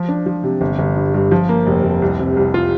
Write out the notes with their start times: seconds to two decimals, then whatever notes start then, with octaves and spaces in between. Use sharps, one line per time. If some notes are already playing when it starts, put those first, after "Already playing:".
Already playing: F3
0.08 D4
0.26 F3
0.44 C3
0.61 G1
0.79 G1
0.96 G2
1.14 G2
1.31 F3
1.49 A#3
1.67 F1
1.84 F1
2.02 C2
2.19 C3
2.36 C2
2.54 F4